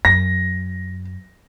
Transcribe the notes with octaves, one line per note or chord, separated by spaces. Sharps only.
F#2 A#6